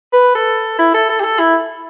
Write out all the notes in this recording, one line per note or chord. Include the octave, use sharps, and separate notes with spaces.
B4
A4
E4
A4
A4
G4
A4
E4